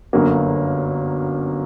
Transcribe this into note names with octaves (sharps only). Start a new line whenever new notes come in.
G1 F#2 D3 F#3 A#3